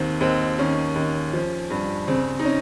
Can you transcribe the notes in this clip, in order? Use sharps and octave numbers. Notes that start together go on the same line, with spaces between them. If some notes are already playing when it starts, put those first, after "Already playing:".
Already playing: D#2 D#3 C4
D#2 C4
D#3 C#4
D#2
F3
G2
C#3 C4
D#4
C#4